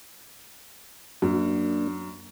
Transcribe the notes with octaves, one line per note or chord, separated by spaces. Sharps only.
F#2 A#3 D4